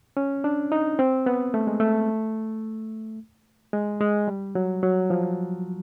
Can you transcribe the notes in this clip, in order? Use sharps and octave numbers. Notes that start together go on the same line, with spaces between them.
C#4
D4
D#4
C4
B3
A3
G#3
A3
G#3
G#3
G3
F#3
F#3
F3